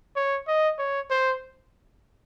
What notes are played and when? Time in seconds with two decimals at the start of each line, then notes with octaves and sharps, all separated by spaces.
0.16 C#5
0.48 D#5
0.79 C#5
1.10 C5